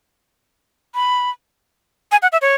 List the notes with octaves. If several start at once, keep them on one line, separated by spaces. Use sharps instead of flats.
B5
G#5
F#5
E5
C#5